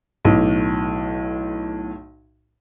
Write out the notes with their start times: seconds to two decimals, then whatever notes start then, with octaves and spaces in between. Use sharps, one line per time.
0.25 B1 A2